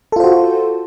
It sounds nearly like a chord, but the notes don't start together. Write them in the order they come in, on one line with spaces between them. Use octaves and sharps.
A4 F4 C5 F#4